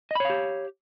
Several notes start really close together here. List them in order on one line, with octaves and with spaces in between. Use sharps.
D#5 B5 C#5 F5 G4